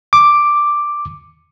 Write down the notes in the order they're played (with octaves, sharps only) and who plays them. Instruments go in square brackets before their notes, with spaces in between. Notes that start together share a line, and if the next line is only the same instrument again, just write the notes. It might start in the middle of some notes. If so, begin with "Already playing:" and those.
[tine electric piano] D6